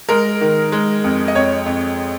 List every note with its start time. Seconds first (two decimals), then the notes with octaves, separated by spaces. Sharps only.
0.09 G#3 A#4
0.41 D#3
0.72 G#3
1.04 F2
1.28 D#5
1.35 F2 C#5
1.66 F2